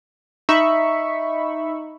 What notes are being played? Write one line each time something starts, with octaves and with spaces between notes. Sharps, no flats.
D#4 E5 B5 C#6